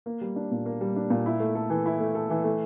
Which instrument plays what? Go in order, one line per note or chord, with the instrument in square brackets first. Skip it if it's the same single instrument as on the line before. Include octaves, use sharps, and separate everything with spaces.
[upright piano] A#3
G3
D4
A#2
A#3
G3
D4
A#2
E4
A3
A4
E3
E4
A3
A4
E3
A3